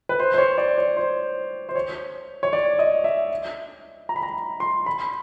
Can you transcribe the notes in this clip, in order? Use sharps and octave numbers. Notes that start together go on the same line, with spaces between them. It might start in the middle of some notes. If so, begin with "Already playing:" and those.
B4
C5
C5
C#5
D5
C#5
C5
C5
C#5
C#5
D5
D#5
E5
A#5
B5
A#5
C6
B5